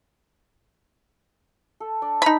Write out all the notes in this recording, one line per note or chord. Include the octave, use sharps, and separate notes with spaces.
A4
D4 D5
D#4 B5